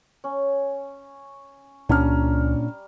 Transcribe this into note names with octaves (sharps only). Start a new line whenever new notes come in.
C#4
C#2 A#2 G3 C#4 D4 A#5 F6